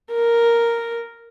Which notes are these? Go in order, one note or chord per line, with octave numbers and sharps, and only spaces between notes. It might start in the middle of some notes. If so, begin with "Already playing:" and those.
A#4